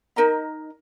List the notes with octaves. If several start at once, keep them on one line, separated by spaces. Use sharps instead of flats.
D#4 A#4 D#5 A#5